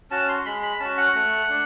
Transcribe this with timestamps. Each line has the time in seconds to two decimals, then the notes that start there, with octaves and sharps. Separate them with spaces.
0.11 C#4 F#4 A5
0.29 C6
0.45 G#3 B5
0.62 B5
0.80 C#4 F#4 A5
0.98 F#5
1.15 A3
1.49 D4